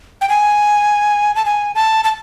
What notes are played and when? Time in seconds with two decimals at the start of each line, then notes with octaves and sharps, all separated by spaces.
0.21 G5
0.29 G#5
1.35 A5
1.46 G#5
1.75 A5
2.04 A5